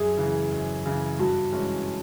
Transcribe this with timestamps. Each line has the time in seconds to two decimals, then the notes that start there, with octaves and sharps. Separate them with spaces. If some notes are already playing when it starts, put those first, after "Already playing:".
Already playing: F#2 G#4
0.17 C#3 E3
0.52 F#2
0.86 C#3 E3
1.19 G2 F#4
1.53 E3 G#3 C#4